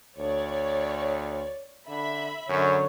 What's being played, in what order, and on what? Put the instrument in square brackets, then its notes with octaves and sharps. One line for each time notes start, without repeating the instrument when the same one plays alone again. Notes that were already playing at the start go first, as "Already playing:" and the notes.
[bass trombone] D2 [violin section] C#5 D5
[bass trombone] D3 [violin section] E5 B5
[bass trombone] F#2 [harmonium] D3 C#5